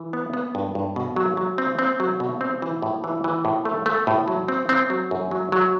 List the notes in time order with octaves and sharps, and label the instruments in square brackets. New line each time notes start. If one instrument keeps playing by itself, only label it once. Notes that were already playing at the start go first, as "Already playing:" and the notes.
Already playing: [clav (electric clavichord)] E3
B3
B3
G2
G2
B2
F#3
F#3
C4
C4
F#3
B2
C4
E3
A2
E3
E3
A2
A3
A3
A2
F#3
C4
C4
F#3
F#2
F#3
F#3